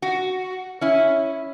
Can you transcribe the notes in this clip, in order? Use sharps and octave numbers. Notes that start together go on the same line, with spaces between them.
F#4
C#4 E4